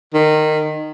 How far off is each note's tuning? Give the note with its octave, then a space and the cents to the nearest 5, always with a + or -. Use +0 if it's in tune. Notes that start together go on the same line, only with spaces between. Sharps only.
D#3 -15